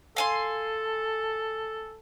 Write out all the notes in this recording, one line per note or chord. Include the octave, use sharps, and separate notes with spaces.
A4 F5 G#5 C6